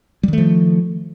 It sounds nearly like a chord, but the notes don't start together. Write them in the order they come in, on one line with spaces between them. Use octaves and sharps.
G3 D#3 A3 F3